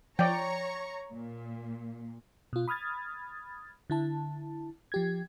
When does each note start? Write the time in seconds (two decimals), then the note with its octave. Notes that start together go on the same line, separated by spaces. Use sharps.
0.19 F3 C#5 D5 G5 A#5 C#6
1.13 A#2
2.53 B2 F4
2.68 B5 D#6 F6 G#6 A6
3.90 D3 E4 A5
4.92 F3 G4 G#6